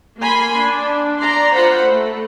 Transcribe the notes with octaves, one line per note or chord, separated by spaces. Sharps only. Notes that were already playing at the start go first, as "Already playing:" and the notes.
A#3 G#5 B5 C6
D4
D5 A#5 C6
F4 C5 F#5 B5
A3